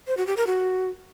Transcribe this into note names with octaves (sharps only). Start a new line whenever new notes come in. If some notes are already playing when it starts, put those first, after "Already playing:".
C5
F#4
G4
A#4
F#4